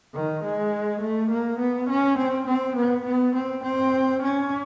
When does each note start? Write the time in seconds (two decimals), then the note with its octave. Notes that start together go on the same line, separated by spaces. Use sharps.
0.14 D#3
0.43 G#3
1.01 A3
1.31 A#3
1.59 B3
1.89 C#4
2.18 C4
2.47 C4
2.76 B3
3.05 B3
3.35 C4
3.63 C4
4.22 C#4